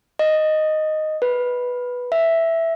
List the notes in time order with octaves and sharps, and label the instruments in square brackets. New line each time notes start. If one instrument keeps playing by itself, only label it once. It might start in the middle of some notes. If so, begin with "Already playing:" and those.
[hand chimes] D#5
B4
E5